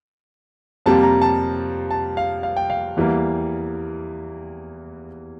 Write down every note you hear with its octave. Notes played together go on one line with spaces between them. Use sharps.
F2 C3 G3 A#3 A5
A#5
A5
A5
F5
F5
G5
F5
E2 E3 G3 A#3